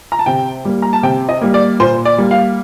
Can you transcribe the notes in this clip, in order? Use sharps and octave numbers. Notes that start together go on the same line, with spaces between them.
A#5
A5
C3 G5
G3 A#3
A#5
A5
C3 G5
D#5
G3 A#3
D5
A#2 C5
D5
G3 A#3
F5